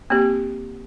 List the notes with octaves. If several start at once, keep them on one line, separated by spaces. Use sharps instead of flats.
A#3 C4 G4